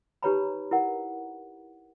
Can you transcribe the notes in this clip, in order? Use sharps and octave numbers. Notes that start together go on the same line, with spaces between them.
D#4 G4 B4 C#5 A#5 B5
E4 A#4 F#5